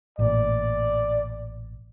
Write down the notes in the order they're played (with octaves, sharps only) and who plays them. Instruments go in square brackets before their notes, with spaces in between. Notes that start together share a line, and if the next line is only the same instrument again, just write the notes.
[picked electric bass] A1 A#2 [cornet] D5